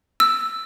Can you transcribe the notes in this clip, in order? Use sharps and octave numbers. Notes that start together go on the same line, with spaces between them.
E6